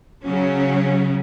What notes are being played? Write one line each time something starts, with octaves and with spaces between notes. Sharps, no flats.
C#3 F#3 C#4